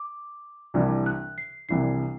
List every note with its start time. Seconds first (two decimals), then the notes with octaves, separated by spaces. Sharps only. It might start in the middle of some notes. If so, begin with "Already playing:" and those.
Already playing: D6
0.74 C2 C3 E3 G3 D4
1.06 F#6
1.38 C7
1.69 C2 C3 E3 G3 D4 C7